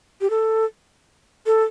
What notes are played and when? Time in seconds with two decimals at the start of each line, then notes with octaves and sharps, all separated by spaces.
0.21 G4
0.30 A4
1.46 A4